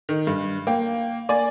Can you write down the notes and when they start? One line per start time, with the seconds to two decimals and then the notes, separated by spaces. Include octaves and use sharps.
0.09 D#3
0.27 G2
0.67 A#3 G5
1.29 A#3 D5 G#5